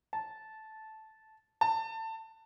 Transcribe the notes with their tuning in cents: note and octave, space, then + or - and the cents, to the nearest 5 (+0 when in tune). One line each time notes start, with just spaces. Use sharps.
A5 -10
A5 +25